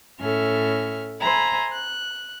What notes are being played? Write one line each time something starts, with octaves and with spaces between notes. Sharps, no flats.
A2 C#4 A4 E5 F6
C5 E5 G#5 A#5 B5
F#6